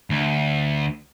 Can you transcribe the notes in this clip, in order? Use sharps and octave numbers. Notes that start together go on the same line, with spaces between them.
D2